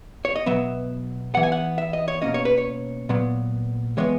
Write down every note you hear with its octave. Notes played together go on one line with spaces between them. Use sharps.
C#5
D#5
B2 F#3 B3 E5
E3 B3 F#5
G#5
F#5
E5
D#5
C#5
B2 A#3 C#4 D#5
C#5
B4
C#5
A#2 F#3 B3
E3 G#3 B3 C#5